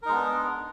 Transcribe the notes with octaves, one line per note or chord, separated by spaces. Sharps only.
G#3 B3 D4 D#4 A#4